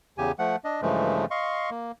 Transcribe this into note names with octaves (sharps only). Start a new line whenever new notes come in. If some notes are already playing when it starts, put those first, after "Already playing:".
E2 C#3 G4 G#5
F3 A3 F#5
D4 D#5
G2 C#3 E3 F3 G#3 A3
D#5 F5 C6 C#6
A#3